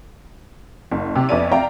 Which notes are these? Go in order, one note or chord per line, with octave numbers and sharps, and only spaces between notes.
F#1
C3 G4
F2 B3 C#4 D5 E5 D#7
D5 E5 F5 G5 A#5